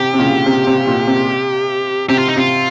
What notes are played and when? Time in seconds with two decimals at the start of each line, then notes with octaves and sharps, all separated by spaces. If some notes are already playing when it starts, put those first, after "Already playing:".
Already playing: C3 G4
0.14 C3
0.19 A#2 C#3
0.46 C3
0.67 C3
0.87 A#2
1.07 C3
2.09 C3 G4
2.18 F4
2.28 D#4
2.36 C3 F4